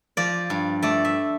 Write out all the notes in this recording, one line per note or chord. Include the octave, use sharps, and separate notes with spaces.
F3 D5
G2
A3 D5
E5